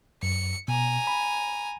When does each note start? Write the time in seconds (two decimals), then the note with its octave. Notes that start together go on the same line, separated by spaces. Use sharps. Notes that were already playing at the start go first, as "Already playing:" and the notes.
0.23 F#2 C#7
0.68 B2 G#5 A#5
1.07 B5